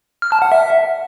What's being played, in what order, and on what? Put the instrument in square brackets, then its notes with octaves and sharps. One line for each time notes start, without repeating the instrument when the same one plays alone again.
[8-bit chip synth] F6
A5
F#5
E5